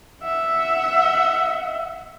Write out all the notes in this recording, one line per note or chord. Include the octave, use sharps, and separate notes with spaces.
E5 F#5